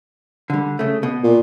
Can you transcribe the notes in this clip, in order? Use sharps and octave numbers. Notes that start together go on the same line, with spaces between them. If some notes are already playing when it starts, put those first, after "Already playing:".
D3 G3
C#3 A3
B2
A#2